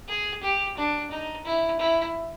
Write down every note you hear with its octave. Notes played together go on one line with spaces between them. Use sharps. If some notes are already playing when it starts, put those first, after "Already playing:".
G#4
G4
D4
D#4
E4
E4